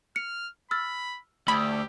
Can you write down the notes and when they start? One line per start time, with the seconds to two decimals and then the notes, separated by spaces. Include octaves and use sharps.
0.16 F6 C#7
0.71 B5 E6 F6 A6
1.48 D2 G4 B5